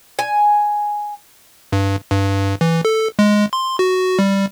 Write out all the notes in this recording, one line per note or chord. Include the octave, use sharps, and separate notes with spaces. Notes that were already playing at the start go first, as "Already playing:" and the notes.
G#5
G2
G2
E3
A4
G#3
C6
F#4
G3